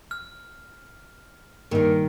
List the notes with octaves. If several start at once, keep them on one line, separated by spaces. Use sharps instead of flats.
F6
G2 A#2 D#3 D#4 A#4